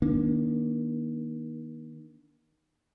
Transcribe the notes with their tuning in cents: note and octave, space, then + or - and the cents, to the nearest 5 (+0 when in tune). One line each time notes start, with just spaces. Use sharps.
D#3 +0 A#3 +30 D4 -25